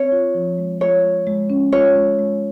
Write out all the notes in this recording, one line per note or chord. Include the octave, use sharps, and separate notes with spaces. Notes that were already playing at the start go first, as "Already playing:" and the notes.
Already playing: C4 C#5
F4
F3
G#3
F4 C#5
G#3
G#3
C#4
F4 C#5
G#3
G#3